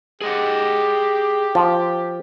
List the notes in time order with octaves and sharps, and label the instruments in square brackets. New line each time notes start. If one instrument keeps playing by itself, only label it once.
[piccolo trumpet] G4 [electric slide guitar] G#4 D#5 F#5
[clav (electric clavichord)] F3